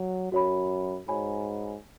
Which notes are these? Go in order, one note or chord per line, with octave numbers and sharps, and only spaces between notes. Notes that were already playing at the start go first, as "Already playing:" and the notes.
Already playing: F#3
F#2 F#4 C#5 B5
G#2 F#4 C#5 G#5 B5